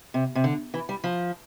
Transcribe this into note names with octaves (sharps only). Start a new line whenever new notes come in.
C3
C3
D3
E3
G3
F3